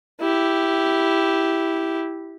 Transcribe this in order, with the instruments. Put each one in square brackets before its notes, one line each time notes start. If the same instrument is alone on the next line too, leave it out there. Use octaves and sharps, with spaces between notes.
[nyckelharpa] E4 G4